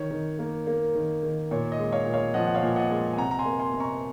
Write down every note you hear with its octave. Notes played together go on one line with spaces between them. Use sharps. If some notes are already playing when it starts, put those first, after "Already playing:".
Already playing: D#3 C#5
D#3
A#3
A#3
D#3
D#3
A#2 C#5
D#5
G#3
C#5 F5
A#2
C#5 F5
F3 D#5 F#5
F#5
C#5 F5
A#2
D#5 F#5
G#3
G#5
C3 F#5 A#5
A#5
G#5 C6
A#3
G#5 C6
C3
A#5 C#6